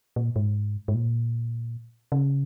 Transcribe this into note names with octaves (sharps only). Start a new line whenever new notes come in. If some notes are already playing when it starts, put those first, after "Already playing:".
A#2
G#2
G#2
A#2
C#3